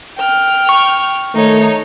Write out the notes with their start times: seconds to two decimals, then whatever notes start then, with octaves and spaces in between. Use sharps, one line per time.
0.17 G5 F6
0.69 C#6
1.35 D#3 A3 D#4 C#5